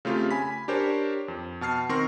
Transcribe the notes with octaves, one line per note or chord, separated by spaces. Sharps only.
C#3 A3 C4 F4 G4
G#5 B5 B6
D4 G4 A#4 C5 C#5
F2
B2 A5 F6 C7
D#3 C4 A#4 C6 C#6 A#6